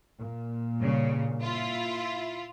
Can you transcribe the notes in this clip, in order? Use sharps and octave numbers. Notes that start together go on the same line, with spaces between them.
A#2
G2 C#3
E4 F4